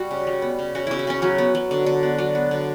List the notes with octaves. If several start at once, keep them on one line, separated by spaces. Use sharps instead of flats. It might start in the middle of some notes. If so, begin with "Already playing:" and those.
Already playing: G3 F#4
C#3
G3
B3
C#3
C#3 F#4
C#3 E4
E4
C#3 C#4
F#3 C#4
B3
F#3
D3
D3
B3
F#3 D4
B3
D3